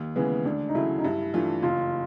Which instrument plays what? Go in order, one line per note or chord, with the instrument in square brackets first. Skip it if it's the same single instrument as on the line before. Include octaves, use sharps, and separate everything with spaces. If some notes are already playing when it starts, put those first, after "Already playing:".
Already playing: [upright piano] D#2
[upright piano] C#3 E3 G#3 [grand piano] B3
[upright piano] D2 [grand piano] D4
[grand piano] D#4
[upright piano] C#3 F#3 A3 [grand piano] E4
[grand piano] D#4
[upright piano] G2 [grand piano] E4
[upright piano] E3 A3 D4 F4
[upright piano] F#1 [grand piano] F4